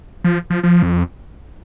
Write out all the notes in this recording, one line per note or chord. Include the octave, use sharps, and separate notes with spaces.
F3
F3
F3
F2